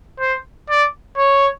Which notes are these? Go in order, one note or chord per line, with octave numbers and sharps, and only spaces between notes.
C5
D5
C#5